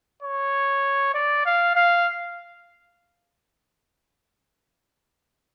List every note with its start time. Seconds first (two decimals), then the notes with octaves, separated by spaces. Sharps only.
0.23 C#5
1.14 D5
1.46 F5
1.76 F5